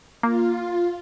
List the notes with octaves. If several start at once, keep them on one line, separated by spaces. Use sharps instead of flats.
A#3 F4